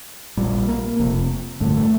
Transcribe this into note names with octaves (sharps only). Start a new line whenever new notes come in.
A#1 A#2 G3
A#3
F1 F2 C3
A1 G2 D3 A3
A3